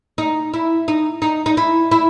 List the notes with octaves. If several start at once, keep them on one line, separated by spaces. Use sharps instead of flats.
D#4
E4
D#4
D#4
D#4
E4
E4